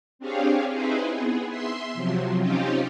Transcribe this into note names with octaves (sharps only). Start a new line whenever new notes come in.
C4 D4 G4 G#4 C#5 F5
C4 D#4 E4 G#4 B4 C5
B3 G#4
E5 C6
C3 F3 F#3
C4 C#4 D#4 F4 G4